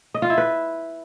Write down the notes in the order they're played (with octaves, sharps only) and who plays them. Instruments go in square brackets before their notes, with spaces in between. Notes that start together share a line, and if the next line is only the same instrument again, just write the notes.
[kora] D#5
F4
E4
B4